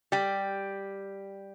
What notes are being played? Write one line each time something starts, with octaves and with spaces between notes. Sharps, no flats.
G3 G4